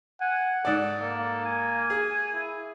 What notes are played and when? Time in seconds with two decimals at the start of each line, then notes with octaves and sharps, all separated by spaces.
0.21 F#5 G#5
0.65 G#2 A4 D5
1.01 A#3 A4
1.45 G#5
1.90 G#4
2.34 E4